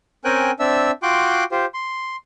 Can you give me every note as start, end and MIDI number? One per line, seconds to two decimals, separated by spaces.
0.25 0.51 60
0.25 0.51 61
0.25 0.51 70
0.25 0.51 79
0.25 0.51 80
0.25 0.51 90
0.59 0.91 60
0.59 0.91 62
0.59 0.91 76
0.59 0.91 88
1.03 1.44 65
1.03 1.44 66
1.03 1.44 79
1.03 1.44 84
1.03 1.44 86
1.03 1.44 90
1.52 1.66 65
1.52 1.66 67
1.52 1.66 72
1.74 2.16 84